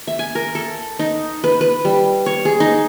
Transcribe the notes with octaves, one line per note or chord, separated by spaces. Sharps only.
E5
G#5
A#4
A4
D#4
B4
B4
G3
C#5
G#4
D#4